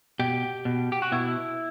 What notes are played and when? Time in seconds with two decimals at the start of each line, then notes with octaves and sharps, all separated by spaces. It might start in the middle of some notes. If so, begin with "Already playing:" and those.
0.19 B2 G4
0.65 B2
0.92 G4
1.02 F#4
1.12 B2 E4